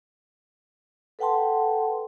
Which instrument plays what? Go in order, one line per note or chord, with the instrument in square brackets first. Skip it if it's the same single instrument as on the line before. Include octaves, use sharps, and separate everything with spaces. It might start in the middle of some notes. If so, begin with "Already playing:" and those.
[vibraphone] A4 B4 F#5 G5 A5 C6